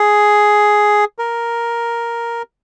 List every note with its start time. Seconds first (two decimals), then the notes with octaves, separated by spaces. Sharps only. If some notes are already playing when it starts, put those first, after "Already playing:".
Already playing: G#4
1.19 A#4